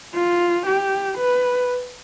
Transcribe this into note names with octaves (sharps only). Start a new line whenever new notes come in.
F4
G4
B4